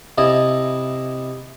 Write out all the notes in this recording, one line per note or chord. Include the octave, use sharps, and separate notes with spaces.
C3 E4 D#5 A5